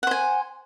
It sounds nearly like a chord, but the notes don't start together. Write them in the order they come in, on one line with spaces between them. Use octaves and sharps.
F#5 C5 G#5